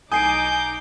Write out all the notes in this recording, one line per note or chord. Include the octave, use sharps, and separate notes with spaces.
B1 D#4 G#5 D6 D#6 G6 C7 D7